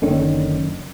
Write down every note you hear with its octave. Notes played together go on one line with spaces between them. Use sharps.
F#1 D3 D#3 C#4